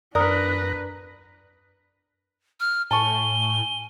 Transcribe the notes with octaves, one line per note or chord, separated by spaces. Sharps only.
F#2 D4 A#4 B4 D5 D#6 F#6 A#6
F6
A2 G#5 A5 C#6 G7